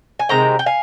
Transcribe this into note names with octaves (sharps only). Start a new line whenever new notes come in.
G#5
C3 D#3 G#3 G5 A#5
G5
F5 G#5